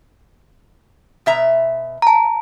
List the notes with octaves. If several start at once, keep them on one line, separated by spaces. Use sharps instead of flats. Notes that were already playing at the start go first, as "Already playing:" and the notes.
B2 E5 A#5
A5 A#5